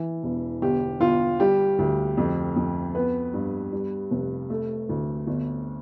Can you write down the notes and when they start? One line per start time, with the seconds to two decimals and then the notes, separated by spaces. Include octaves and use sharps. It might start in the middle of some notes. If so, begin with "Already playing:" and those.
Already playing: E3
0.23 E1
0.62 G1 G4
1.00 G1 F4
1.40 G3 G4
1.79 D2
2.17 F2
2.56 F2
2.95 B3 B4
3.33 G2
3.72 G3
4.11 F1
4.50 A3
4.89 D2
5.27 G1